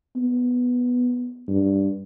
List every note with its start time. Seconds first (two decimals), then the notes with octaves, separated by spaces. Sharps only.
0.16 B3
1.48 G2